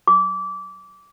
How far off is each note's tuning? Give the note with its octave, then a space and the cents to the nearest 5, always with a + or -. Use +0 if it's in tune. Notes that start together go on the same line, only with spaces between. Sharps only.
D6 -25